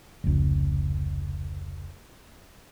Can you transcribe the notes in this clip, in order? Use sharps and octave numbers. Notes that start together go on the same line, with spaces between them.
F1 C#2